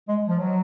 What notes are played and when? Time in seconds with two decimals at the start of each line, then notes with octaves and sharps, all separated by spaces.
0.08 G#3
0.28 F3
0.38 F#3